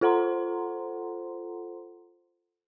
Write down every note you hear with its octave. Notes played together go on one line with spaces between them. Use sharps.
F4 A4 C5 F#5 A#5 C6